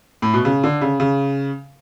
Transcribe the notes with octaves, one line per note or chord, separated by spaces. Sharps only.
A2
B2
C#3
D3
C#3
C#3